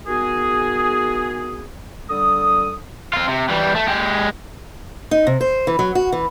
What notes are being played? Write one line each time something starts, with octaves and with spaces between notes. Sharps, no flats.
D#3 B3 F#4 G#4
D3 G3 A4 D#6
C4 F4
C3
E3 G3
A3
G#3 G4
D#4
C3
C5
E3
F#3
F#4
E3